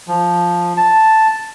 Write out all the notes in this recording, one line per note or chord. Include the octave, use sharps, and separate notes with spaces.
F3
A5